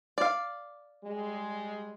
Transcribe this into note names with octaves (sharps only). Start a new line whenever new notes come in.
D5 F5
G3 G#3